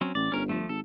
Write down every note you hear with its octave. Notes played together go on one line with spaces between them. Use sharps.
F#3 C4 C#4
A1 D5
G1 C#4 A#4
F3 A3
G#1 A4